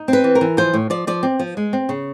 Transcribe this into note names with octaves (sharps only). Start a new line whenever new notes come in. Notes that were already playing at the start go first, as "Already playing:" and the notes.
Already playing: D#4
C4
B4
E3
A#4
E3
F3 C5
A2
F3 D5
F3 D5
C4
F3
G#3
C4
C#3